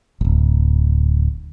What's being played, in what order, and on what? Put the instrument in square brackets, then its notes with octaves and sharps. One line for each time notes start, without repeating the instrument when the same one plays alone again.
[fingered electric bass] D1 G#1